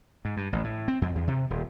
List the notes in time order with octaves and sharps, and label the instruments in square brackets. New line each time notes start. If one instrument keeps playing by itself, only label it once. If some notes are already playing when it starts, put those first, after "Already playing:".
[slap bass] G#2
G2
A1
A2
C4
F2
E2
C3
D#1